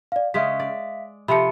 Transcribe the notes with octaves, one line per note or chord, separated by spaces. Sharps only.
D5 F5
C#3 G#3 C#4 E5 F5 B6
D5
C3 F3 A4 B5 C#7